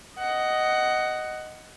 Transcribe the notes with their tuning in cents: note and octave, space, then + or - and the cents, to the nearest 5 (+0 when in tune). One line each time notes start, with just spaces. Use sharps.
D#5 +0 F#5 +15